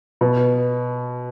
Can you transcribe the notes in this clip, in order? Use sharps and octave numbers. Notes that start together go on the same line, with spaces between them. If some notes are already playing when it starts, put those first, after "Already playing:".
B2